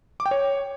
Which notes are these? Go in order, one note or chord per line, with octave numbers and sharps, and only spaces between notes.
D6
G5
C#5